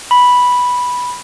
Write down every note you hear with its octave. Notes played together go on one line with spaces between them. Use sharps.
B5